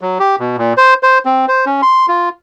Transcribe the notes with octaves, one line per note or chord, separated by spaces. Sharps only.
F#3
G4
B2
A#2
C5
C5
C4
C5
C#4
C6
F4